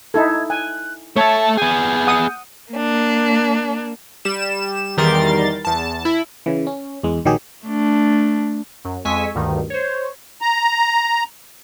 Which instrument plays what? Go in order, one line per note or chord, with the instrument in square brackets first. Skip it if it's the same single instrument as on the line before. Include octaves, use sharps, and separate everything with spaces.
[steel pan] D#4 E4 A4 [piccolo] G#6
[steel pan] G#5 [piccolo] F#6
[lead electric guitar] A3 E5 [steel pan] C#5 [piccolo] A5
[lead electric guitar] B3 G#4 [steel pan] G#5 [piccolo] G6
[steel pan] F#5 D#6
[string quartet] A#3 D4
[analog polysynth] G3 E7
E2 D#3 G3 A#4 C6 A6
E2 A5
E4
[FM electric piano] C#3 E3
C#4
E2 G#3
A#1 D#3 F#3 G4 G#4
[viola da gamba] A3 D4
[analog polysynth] F#2
F2 G#3 G#5 C#6 E6 B6
D2 G2 D#3
C5 C#5
[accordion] A#5